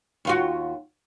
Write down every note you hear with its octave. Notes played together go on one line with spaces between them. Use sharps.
D#2 F4 F#4